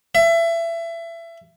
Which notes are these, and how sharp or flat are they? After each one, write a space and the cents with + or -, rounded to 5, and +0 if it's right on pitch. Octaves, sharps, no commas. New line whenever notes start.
E5 +25